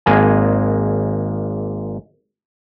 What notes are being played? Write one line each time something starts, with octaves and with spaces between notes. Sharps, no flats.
G#1 G#3 A#3 G#5